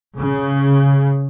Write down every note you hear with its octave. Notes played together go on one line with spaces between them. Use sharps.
C#3